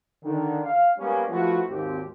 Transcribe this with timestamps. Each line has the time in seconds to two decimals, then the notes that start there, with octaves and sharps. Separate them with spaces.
0.23 D3 D#3
0.63 F5
0.98 G3 G#3 A#3 B3 C#4
1.30 F3 A3 B3 E4 F#4
1.69 G#1 D#2 C4 G4